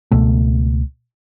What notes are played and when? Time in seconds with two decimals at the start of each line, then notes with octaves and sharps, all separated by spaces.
0.11 C#2 B2 A3